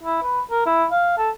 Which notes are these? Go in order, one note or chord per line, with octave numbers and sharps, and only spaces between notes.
E4
B4
A#4
E4
F5
A4